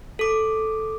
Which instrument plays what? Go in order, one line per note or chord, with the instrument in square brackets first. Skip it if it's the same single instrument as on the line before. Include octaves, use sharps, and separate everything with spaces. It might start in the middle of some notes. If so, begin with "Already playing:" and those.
[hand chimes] A4 D6